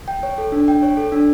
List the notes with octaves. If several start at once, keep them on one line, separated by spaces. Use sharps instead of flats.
G5
C#5
A4
D4
G5
C#5
A4
D4